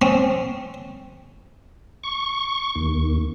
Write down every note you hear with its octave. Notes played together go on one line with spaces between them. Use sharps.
C4 C#4
C#6
D#2